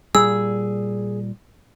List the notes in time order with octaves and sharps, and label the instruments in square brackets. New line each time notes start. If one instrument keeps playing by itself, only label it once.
[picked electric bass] A#2 G3 [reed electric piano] G#4 [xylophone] E6